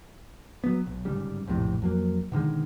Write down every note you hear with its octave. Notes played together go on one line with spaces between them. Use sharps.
F#3 B3
B1
G1 G#2 C#3 G3
A#1 F2 A2 C3
F2 F#3 A#3
B2 D3 D#3 G#3